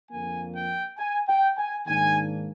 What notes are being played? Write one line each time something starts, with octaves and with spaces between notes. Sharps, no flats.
F2 D3 F3 A#3 G#5
G5
G#5
G5
G#5
G#2 D#3 A#3 D4 G#5